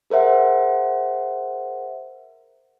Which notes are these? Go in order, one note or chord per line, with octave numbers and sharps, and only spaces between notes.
G#4 A#4 C5 E5 F#5